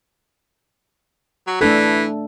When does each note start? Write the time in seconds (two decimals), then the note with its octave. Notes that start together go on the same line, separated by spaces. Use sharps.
1.47 F#3
1.61 E3 A3 D4 A4